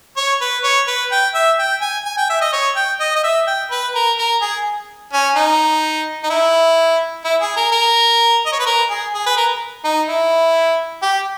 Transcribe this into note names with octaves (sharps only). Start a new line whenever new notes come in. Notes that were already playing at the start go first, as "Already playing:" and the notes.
C#5
B4
C#5
B4
G5
E5
G5
G#5
G#5
G5
E5
D#5
C#5
G5
D#5
D#5
E5
G5
B4
A#4
A#4
G#4
C#4
D#4
D#4
E4
E4
G#4
A#4
A#4
D#5
C#5
B4
A#4
G#4
G#4
B4
A#4
D#4
E4
G4